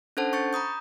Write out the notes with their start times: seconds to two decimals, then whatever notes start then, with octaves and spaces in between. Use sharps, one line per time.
0.17 C#4 D4 A4 C5 F#5 A5
0.33 C#6 G6 A6 C#7
0.53 A#5 B5 D#6 G6